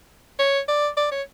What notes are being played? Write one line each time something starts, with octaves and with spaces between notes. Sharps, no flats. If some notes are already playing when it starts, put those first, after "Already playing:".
C#5
D5
D5
C#5